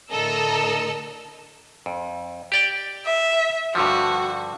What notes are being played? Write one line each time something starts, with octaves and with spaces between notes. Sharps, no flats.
A2 D3 A4 A#4 D#5 E6
F2
G4 D5 G5
E5
G2 D3 F3 F#4